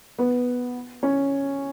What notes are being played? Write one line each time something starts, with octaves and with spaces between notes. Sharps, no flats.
B3
C#4